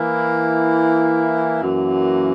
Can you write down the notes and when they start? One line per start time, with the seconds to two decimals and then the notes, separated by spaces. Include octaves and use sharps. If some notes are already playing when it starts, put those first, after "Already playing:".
Already playing: E3 A#3 E4
1.61 F#2 E3 A#3 C#4 F#4